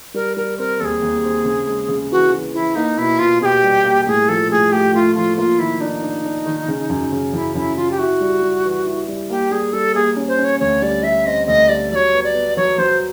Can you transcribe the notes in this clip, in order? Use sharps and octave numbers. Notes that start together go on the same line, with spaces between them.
G3 A#4
G3 A#4
C4 A#4
D#2 G#4 A4
D#2
C4
C#3
G#3
C#3
E3 F#4
E3
E3 E4
A#3 D#4
B2 E4
B2 F4
B2 G4 G#4
G3
A#3
A2 G#4
F3 A4
A2 G#4
A3 G4
A3 F4
F3 F4
A#3 F4
D#3 E4
D4 D#4
D4
D4
D#3
C#3
F#2
C#3
F#2 E4
F#2 E4
C#3 F4
G4
E4 F#4
G3
G3
E3
E4
G3
A#3 G4
G3 G#4
G3 A4
A#3 G#4
C#4
C5
C#4
C#5
D2 C#5
G3 D5
G3 E5
C4 D#5
D2 D#5
G3 D5
F#3 C#5 D5
B3
D5
B3
F#3 C#5
F#3 C5